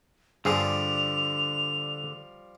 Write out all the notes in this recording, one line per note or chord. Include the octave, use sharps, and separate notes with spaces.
G2 D3 F3 G3 G#4 F7